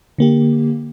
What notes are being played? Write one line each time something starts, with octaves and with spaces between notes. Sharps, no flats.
D3 A#3 G4